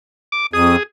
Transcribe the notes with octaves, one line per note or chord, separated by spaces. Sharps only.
D6
F2 G#4 D#6